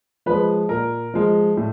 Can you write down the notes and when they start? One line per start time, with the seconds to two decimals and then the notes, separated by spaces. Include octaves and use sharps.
0.26 F3 G#3 B4
0.69 A#2 A#4
1.14 F3 G#3
1.57 A2